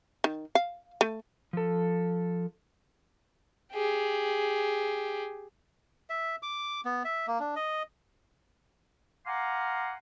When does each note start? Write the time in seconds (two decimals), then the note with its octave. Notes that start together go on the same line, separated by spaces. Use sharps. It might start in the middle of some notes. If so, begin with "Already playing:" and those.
0.24 D#3
0.55 F5
1.01 A3
1.53 F3 A4
3.73 G4 G#4
6.10 E5
6.43 D6
6.85 B3
7.05 E5
7.27 A#3
7.40 D4
7.56 D#5
9.27 F5 F#5 G#5 A#5 C6 D6